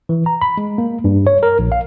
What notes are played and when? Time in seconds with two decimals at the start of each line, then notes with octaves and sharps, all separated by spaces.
0.09 E3
0.26 A#5
0.42 B5
0.57 G#3
0.78 A#3
1.04 G2
1.27 C#5
1.43 A#4
1.59 A#1
1.72 F5